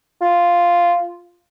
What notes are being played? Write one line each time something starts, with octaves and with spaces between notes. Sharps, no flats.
F4